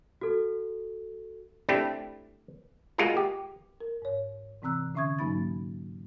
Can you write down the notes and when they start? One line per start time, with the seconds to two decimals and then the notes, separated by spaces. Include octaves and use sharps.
0.21 F#4 A4
1.69 A3 C4 D4 E4 G4
2.98 G#3 A#3 F4 F#4 G#4 A#4
3.17 G4
3.81 A#4
4.02 G#2 C#5
4.62 C3 E3 C4 A#5 E6 F#6
4.95 D3 C#4 E5 C#6 D#6 G#6
5.19 G#2 F#3 A#3 D#4 B5 A6